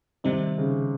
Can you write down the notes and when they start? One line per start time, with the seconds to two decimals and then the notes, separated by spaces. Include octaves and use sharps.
0.24 C3 D#3 G3 C4 D#4
0.58 C#3